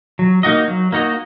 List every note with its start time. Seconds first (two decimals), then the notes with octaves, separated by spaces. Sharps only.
0.19 F#3
0.43 A#3 D#4 F#4 D#5
0.68 F#3
0.92 A#3 D#4 F#4 D#5